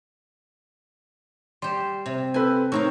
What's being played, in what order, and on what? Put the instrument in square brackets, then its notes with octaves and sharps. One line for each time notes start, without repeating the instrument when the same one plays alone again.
[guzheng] G3 G4 [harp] C6 E7
[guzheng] C3
[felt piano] C4 A4 B4 [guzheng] G#5
[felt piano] A2 [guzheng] C4 A#4 F5 [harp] D#4 C#5 C#6